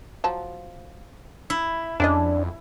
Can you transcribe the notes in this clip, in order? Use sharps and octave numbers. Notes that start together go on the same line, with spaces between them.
F3 F#3 A5
E4
F2 G#3 C#4 D4 D#5